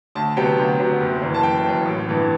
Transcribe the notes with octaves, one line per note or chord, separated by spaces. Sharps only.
D2 A5
C3 F#3 B3 G5
D2
C3 F#3 B3
F#1
F#2 E3
A5
F#1 G5
F#2 E3
A1
G2 E3 B3